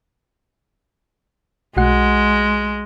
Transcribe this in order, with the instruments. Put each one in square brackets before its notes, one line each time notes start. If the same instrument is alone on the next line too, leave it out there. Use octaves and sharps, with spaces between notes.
[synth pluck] B1 F#4 F#5 [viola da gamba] G#3